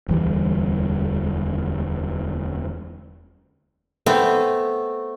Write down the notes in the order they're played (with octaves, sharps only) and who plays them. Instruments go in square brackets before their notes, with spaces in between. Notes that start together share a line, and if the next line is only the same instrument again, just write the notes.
[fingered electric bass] E1 D2 E3 G3
[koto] A3 B3 C4